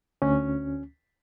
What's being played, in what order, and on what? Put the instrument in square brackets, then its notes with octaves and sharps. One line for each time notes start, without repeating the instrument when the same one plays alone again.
[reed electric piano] D2 C#4